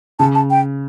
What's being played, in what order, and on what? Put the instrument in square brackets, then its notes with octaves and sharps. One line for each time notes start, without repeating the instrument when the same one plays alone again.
[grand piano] C#3 [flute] A5
[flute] A5
G5